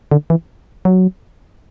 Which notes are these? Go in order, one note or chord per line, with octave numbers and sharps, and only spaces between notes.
D3
E3
F#3